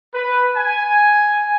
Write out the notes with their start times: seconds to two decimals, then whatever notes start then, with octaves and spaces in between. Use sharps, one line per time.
0.14 B4
0.57 G#5